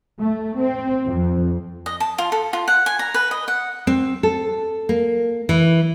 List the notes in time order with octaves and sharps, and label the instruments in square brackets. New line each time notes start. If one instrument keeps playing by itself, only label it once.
[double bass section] A3
C4
F2
[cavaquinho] D#5
A5
F4
A4
F4
F#5
G#5
A#5
B4
D#5
F#5
[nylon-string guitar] C4
A4
A#3
E3